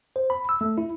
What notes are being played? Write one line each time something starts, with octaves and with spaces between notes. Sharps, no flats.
C5
B5
E6
A3
E4